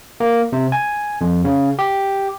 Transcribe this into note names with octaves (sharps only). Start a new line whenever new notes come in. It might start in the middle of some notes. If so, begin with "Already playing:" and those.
A#3
C3
G#5
F2
C#3
G4